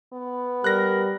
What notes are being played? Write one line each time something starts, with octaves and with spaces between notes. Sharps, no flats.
B3
G3 A#4 F#6 A#6